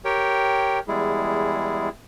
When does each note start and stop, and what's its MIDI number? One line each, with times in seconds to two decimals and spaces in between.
0.05 0.79 67
0.05 0.79 70
0.05 0.79 73
0.05 0.79 79
0.88 1.89 40
0.88 1.89 55
0.88 1.89 56
0.88 1.89 64
0.88 1.89 68